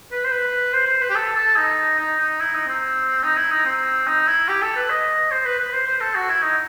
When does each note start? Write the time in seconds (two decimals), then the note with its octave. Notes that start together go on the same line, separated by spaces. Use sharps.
0.12 B4
0.24 C5
0.32 B4
0.73 C5
0.87 C5
1.01 B4
1.10 G4
1.15 A4
1.36 A4
1.56 D#4
1.99 D#4
2.20 D#4
2.40 E4
2.54 D#4
2.67 C4
3.23 D#4
3.37 E4
3.51 D#4
3.65 C4
4.07 D#4
4.27 E4
4.48 G4
4.62 A4
4.76 B4
4.90 D#5
5.31 C5
5.45 B4
5.59 B4
5.73 C5
5.87 C5
6.01 A4
6.15 F#4
6.29 E4
6.42 D#4